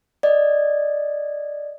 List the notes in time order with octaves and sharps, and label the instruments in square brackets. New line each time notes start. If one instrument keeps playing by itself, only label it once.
[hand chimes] D5 D#5